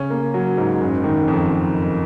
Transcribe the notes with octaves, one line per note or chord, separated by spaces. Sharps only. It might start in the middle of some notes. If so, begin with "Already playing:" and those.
Already playing: C#3 C#4
A#3
F#3
G#2
F#1
D#3
F2